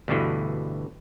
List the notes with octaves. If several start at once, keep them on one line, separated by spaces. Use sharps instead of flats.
D2 G2 B2 D3 E3